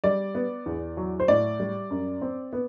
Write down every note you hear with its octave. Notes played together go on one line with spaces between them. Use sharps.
G3 D5
B3
E2
F#3
C5
A2 D5
G3
F#2
C4
B3